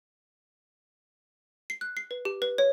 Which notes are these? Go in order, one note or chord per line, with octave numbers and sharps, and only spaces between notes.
C7
F#6
C7
B4
G4
B4
C#5